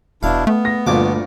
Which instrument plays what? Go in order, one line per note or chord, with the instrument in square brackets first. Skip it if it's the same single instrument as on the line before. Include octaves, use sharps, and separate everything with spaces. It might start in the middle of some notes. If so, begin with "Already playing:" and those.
[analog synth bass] E1 [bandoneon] B2 D4 E4 [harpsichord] F5
[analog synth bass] A3 [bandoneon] B3
[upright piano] A#6
[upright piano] G1 [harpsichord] D2 A#2 D6